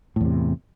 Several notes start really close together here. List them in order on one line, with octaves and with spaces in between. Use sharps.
A2 E2 C3